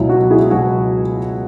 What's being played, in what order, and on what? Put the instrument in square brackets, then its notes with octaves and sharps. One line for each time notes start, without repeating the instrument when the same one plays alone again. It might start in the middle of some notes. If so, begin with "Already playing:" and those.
Already playing: [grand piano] C#2 B2 F#3 E4
F#4
E4 G#4
C#2 B2 F#3 F#4